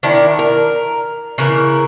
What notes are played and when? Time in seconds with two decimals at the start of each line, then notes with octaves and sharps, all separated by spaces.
0.03 D#3 D4 E4
0.39 A#4
1.38 C#3 E3 E4 A#4